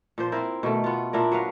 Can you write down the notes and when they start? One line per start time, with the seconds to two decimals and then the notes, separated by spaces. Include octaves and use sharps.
0.18 A#2 F3 C5
0.32 C4 E4 A#4 C5
0.63 B2 D#3 A3
0.84 B3 F4
1.13 A#2 D4 E4 A#4
1.32 F#3 B4 F5